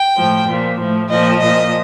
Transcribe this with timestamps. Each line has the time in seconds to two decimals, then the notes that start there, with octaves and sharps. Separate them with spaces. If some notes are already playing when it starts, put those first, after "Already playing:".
Already playing: G5
0.16 A2 F3
0.47 A#2 F3
0.79 A2 F3
1.10 A#2 F3 D#5
1.41 A#2 F3 D#5